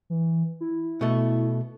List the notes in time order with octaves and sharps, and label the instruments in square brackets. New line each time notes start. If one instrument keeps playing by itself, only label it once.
[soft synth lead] E3
E4
[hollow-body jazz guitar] B2 A3